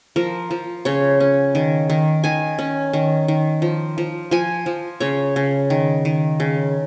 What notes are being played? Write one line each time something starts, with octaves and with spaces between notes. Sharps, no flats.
F3 A#4
F3
C#3 C#5
C#4
D#3
D#3
D#3 G#5
C#4
D#3
D#3
F3
F3
F3 G#5
F3
C#3 C#5
C#3
D#3
D#3
C#3